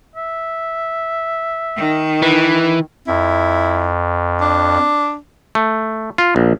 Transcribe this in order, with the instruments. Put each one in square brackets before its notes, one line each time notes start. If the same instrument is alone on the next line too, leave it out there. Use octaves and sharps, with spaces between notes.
[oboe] E5
[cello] D#3
[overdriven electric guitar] E3 [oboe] B4
[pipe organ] F2 [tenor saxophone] E4
[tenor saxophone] D4
[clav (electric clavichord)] A3
F4
A#1